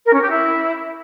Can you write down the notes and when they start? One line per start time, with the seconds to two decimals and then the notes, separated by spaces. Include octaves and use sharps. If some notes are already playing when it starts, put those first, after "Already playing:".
0.05 A#4
0.14 C#4
0.22 G4
0.30 E4